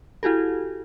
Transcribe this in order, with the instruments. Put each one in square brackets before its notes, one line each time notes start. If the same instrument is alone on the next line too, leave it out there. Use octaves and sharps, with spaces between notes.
[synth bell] E4 F#4 G4 A4